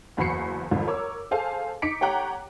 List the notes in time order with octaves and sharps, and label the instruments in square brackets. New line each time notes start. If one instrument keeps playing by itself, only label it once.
[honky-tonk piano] F#1 E2 F#4 B5 C7 C#7
C2 F2 G#2 D#3
A#4 C#5 D6 E6
G#4 A4 C5 F5 G#5 A5
D#4 D6 B6 C#7 D7
G4 C#5 F#5 G5 A#5 F#6